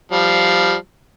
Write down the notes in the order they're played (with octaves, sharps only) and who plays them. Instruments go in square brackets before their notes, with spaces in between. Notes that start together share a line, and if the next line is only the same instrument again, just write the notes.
[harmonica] F3 G3